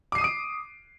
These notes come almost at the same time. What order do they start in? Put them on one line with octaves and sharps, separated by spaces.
D6 C7 D#7 D#6 D7